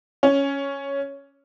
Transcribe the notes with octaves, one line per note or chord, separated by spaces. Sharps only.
C#4